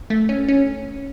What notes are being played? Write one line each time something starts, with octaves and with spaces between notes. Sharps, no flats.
A3
C#4
C#4